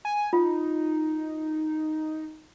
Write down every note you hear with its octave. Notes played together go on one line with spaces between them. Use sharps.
G#5
D#4 F4